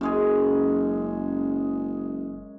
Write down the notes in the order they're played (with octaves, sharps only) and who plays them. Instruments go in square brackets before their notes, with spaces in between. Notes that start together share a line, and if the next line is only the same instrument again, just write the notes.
[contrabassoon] F#1 [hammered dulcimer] F#2 G#3 G#4